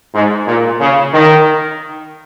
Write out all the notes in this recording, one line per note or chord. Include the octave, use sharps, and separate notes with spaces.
G#2
A#2
C#3
D#3